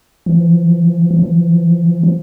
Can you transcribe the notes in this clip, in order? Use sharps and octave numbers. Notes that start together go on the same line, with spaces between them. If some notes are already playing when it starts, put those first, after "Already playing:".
E3
F3
E3
F3
E3
F3
E3
F3
E3
F3
E3
F3
E3
F3
E3
F3
E3
F3
E3
F3
E3
F3